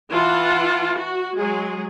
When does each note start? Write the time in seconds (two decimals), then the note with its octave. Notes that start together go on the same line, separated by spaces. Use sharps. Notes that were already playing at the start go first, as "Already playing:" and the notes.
0.11 E3 F4 F#5 A5
0.99 F#4
1.37 F#3 G#3 G#4